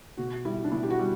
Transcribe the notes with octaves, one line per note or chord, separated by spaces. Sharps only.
B2 F#4
G3 E4
D4
B2 E4
G4
F#4
G3